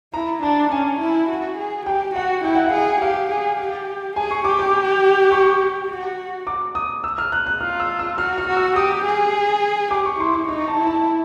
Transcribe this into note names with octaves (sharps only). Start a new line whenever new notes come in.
E4 A#5
D4 A5
C#4 G#5
E4
F#4
G#4
G4 G5
F#4 F#5
E4 G5
F#5
F5
G#4
F#5
G4 F5
G#4
G4
G#4 G#5
C#6
G4 D6
D6
C#6
F#4
D6
D#6
E6
F6
F#6
F#6
F4 F6
E6
E6
F#4 F6
F6
F#4
E6
G4 D#6
G#4
G4 D6
C#6
E4 C6
C#6
D#4 C#6
A5
E4
A5